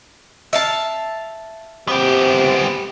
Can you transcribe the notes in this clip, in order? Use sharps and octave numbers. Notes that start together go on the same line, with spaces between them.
E5 F5 A5
C3 B3 G4